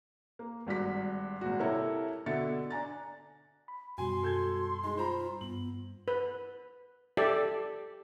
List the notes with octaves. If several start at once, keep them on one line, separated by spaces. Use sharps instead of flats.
A#3
G#1 G2 F#4 B6
G#1 A#2 F#4
C3 E4 A4 A#4 C#5
B2 D3 E5 A6 C#7
D4 G#5 A#5 A6
B5
F#2 B2 G3 F#4 G#5 C6
A4 G6 G#6
G#3 D#4
F4 C5 A#5 B5
G2 B3 F#7
B4
G4 A4 D5 E5